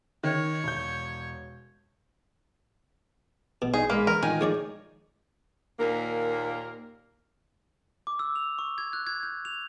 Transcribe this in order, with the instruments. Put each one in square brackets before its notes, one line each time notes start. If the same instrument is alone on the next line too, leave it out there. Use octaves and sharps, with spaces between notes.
[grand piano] D#3 [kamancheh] C#5
[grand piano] E1 G6
[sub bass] A1 [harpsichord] B2
[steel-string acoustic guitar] D#4 [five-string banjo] G#4
[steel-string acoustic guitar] G#3 B4 [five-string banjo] A#3
[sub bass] E3 [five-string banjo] A#4
[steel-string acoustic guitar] D#3 D#4 F4 [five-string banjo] G#5 [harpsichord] A#5
[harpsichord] G#3 C#5 D5
[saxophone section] D#2 A#2 A#3 A#4
[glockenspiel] D6
E6
F7
C#6
G#6
F#6
G#6
G6
F7